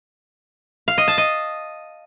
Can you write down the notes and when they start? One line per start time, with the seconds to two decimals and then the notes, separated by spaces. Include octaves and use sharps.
0.88 F5
0.98 D#5
1.08 A5
1.18 D#5